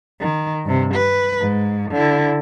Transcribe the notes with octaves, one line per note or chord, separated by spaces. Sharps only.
D#3
G2 C3
B4
G#2
D3 E4